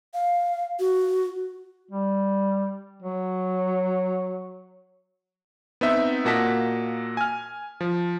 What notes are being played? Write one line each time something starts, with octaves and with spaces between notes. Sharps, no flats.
F5
F#4
G3
F#3
B3 C4 D#4 E5
A#2 A#3 F#4 D#5 A5 B6
G#5 F6
F3